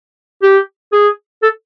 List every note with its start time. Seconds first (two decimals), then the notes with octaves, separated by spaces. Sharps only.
0.43 G4
0.93 G#4
1.43 A4